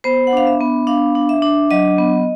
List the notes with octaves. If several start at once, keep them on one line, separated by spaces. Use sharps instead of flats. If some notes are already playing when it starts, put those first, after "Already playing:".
B3 C5
F#5
D4 F5
E5
B3
D4 F5
D4
E5
D4
F#3 D#5
B3